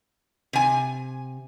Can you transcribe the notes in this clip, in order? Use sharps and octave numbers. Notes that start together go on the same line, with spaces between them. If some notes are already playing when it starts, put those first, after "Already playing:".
C3 G#5